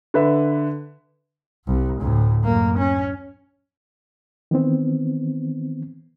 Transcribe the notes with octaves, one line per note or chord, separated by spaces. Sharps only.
D3 B4 E5
C2
D2 A2
F#2 A#3
C#4
D#3 E3 B3 C4